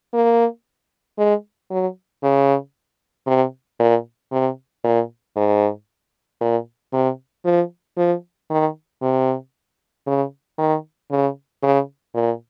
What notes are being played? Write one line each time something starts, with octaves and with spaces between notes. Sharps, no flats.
A#3
G#3
F#3
C#3
C3
A#2
C3
A#2
G#2
A#2
C3
F3
F3
D#3
C3
C#3
D#3
C#3
C#3
A#2